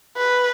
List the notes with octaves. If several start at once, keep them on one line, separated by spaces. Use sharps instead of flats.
B4